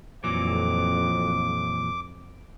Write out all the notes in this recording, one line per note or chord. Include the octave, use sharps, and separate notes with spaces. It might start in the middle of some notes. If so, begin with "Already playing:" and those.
F2 A#2 E3 F#3 D6